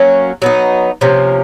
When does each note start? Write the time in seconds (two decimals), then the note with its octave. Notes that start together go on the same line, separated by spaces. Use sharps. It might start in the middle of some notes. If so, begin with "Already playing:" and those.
Already playing: F#3 A#3 C#4
0.42 F#3 B3 D#4
1.01 C3 F3 A#3 C#4